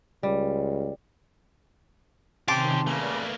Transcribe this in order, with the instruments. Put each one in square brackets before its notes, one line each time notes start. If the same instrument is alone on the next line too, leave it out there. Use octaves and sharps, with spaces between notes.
[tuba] C#2 [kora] G3
[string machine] C3 D#3 [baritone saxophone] C4 [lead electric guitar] C#4 G4 [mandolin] A5 C6 D6
[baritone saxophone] C#3 [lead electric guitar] A3 A#3 [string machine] B4 D5